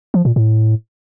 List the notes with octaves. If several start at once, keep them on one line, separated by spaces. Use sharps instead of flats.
F3
A#2
A2